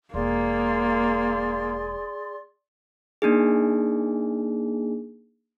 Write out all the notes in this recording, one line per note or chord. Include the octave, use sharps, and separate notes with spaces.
E1 A#3 G#4 D5 C6
A#3 D4 D#4 G#4